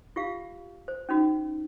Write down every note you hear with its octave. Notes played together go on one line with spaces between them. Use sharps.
F4 G4 F5
C5
C#4 D#4 F#4